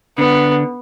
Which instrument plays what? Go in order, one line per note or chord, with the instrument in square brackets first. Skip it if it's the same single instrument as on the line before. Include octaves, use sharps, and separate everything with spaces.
[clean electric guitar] D3 D4 [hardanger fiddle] B3